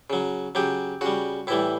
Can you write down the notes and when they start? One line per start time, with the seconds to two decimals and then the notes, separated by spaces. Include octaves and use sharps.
0.10 C#3 F#3
0.55 C#3 F#3 G4
1.01 C#3 G3 F#4
1.47 A2 E3 G3 E4